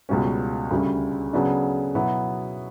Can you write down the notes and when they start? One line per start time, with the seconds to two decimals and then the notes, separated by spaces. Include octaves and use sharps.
0.09 C#2 B2 G3 C#4
0.71 D2 C#3 G3 C#4
1.33 C#3 F#3 B3 D4
1.95 B2 F#3 B3 E4